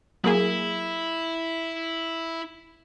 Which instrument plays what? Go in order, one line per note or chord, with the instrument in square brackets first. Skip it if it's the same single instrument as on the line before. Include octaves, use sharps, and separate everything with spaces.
[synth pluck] F#3 A#3 G#4 [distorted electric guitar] E4